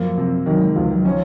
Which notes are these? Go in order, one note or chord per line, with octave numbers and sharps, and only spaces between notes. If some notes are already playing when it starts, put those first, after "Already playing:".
Already playing: F#2 F3 A#3
C3
D#3 F#3
G#3
C#2 F3
F#3
F3 C#4